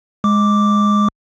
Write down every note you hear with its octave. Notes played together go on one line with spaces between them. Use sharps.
G#3 D6